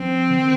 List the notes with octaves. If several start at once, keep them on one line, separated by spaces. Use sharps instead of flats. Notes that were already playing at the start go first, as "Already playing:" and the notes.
Already playing: F3 C4
D3
D#3